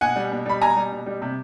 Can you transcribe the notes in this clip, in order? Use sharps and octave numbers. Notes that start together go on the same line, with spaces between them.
B2 F#5 G#5
G3
B2
G3 B5
B2 G#5 A#5
G3
B2
G3
C3